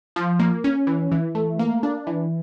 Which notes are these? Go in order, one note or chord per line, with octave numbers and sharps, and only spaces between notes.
F3
A#3
C#4
E3
E3
A3
A#3
D4
E3